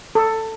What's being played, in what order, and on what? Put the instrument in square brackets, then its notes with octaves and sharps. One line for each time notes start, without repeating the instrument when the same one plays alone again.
[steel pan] A4